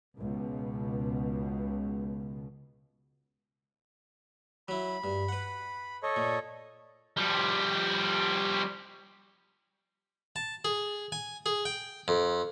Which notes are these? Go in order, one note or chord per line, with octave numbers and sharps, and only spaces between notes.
C#2 B2
F#3 E4 B5
G2
B4 F#5
A4 C#5 D#5
A#2
F3 G3
A5
G#4
G#5
G#4
G5
F2